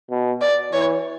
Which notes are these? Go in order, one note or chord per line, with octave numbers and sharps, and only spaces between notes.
B2
D5
E3 C#5